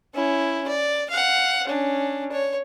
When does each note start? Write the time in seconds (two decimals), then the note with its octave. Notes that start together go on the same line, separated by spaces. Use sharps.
0.14 C#4 E4
0.68 D5
1.10 F5 F#5
1.67 C#4 D4
2.32 C#5